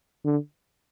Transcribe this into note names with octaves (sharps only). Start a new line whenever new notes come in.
D3